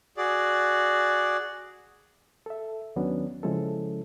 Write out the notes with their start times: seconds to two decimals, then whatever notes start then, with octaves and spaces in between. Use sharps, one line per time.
0.17 F#4 G#4 D5
2.46 A4 E5
2.96 D#2 D#3 F#3 B3 C#4 D4
3.43 C#3 F3 G#3 C#4 E4 A4